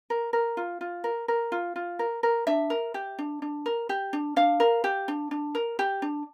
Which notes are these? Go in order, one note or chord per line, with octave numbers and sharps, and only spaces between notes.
A#4
A#4
F4
F4
A#4
A#4
F4
F4
A#4
A#4
D4 E5
A#4
G4
D4
D4
A#4
G4
D4
D4 F5
A#4
G4
D4
D4
A#4
G4
D4